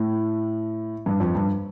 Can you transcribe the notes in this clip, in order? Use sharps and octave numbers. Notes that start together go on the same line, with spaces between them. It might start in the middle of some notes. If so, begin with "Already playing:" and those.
Already playing: A2
G2
F2
G2